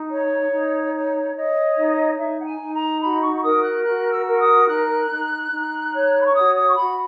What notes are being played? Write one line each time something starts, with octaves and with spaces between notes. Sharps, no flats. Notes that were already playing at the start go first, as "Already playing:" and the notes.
Already playing: D#4
C#5
D#4
C#5
C#5 D#5
D#4
D#4 E5
F#5
G#5
D#4
A#5
F#4 B5
C#6
C#6
A#4 D#6
F#6
F#4 F#6
E6
A#4
D#6
D#4 F#6
D#4
D#4
C#5
B5
C#6
F#4 D#6
D#6
C#6
F#4 B5